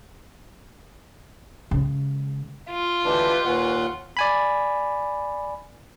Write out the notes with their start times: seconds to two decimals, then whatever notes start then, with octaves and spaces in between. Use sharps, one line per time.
1.71 C#3 G#3
2.70 F4
3.05 D2 E3 D4 G4 B4 D#5
3.46 D#2 A#2 B4 F#5 G#5 C#6
4.17 D5 G#5 B5